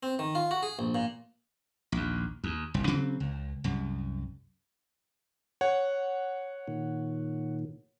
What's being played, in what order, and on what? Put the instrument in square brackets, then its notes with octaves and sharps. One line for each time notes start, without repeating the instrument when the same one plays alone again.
[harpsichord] C4
D#3
F4
F#4
G#4
A#1
A#2
[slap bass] A#1 D#2
D#2
F#1 C2
C#3 F#3 C4
C#2
C2 F#2
[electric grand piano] C#5 F#5
[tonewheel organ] A#2 D#3